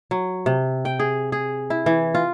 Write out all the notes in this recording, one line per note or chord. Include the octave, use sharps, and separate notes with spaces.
F#3
C3
G5
G#4
G#4
E4
E3
F4